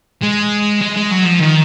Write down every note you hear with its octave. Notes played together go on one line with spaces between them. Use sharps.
G#3
G#3
G#3
F#3
F3
D#3